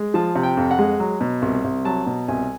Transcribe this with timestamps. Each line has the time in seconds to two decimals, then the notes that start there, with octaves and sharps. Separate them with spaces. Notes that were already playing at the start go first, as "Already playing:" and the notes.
Already playing: G#3
0.14 F3 A5
0.35 C3
0.43 G5
0.57 F2
0.71 F#5
0.79 G#3
1.00 F#3
1.21 B2
1.42 C2
1.64 C2
1.85 F#3 A5
2.07 B2
2.28 C2 G#5